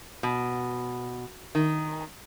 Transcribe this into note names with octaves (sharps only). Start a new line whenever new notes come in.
B2
D#3